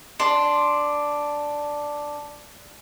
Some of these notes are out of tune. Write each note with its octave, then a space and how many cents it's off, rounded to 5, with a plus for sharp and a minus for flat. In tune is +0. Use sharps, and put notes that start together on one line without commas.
D4 +0 C6 +0